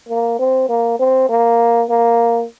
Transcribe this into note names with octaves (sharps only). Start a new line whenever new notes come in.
A#3
C4
A#3
C4
A#3
A#3